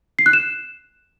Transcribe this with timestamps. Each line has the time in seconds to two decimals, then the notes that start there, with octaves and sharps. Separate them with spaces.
0.19 C7
0.26 F#6
0.33 E7